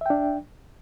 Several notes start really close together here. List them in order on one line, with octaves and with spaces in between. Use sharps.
E5 G5 D4